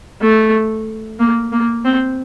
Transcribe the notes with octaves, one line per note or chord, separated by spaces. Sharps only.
A3
A#3
A#3
C4